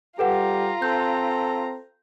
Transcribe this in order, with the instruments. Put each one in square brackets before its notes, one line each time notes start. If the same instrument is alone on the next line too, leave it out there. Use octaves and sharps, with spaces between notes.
[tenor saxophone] G3 [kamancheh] F4 A#5 [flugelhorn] G4 [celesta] A4 B4 F#5
[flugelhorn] C4 [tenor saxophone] A4 [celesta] G6